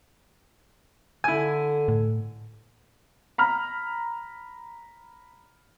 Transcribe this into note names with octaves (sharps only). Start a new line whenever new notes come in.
D3 E4 G#5
A2
A#5 B5 F6